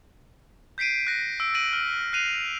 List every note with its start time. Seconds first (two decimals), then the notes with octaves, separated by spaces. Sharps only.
0.78 G6 B6 C7 D7 D#7
1.07 F#6 A#6
1.40 E6 D7
1.54 A#6 D7 D#7 F#7
1.73 F6
2.13 F#6 C7 D#7 F7